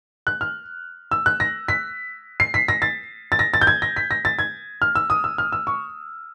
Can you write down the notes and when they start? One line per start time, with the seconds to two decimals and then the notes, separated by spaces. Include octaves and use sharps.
0.27 F#6
0.41 F6
1.11 E6
1.26 F#6
1.40 A#6
1.68 B6
2.40 C7
2.54 B6
2.68 A#6
2.82 A6
3.32 A6
3.39 A#6
3.54 A6
3.61 G6
3.67 G#6
3.82 A#6
3.96 B6
4.11 A#6
4.25 A6
4.39 G#6
4.82 F6
4.95 E6
5.10 D#6
5.24 E6
5.38 F6
5.52 E6
5.67 C#6